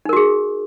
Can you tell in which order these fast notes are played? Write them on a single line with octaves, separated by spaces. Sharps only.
D#4 A#4 F#4 G#4